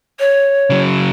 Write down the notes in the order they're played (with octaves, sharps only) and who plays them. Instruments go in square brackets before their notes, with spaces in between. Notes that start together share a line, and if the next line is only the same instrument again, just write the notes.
[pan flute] C#5
[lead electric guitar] C#3 F#3